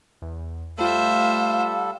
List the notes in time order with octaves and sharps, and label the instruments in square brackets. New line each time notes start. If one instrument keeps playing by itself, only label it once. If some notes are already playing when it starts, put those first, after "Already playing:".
[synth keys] E2
[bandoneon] G3 A4 [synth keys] A3 F4 [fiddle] C5 E5 [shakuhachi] F5